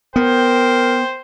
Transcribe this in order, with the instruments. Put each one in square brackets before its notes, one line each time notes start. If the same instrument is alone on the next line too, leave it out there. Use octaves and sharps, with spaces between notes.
[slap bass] B3 [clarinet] A#4 [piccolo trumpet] C5 [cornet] G5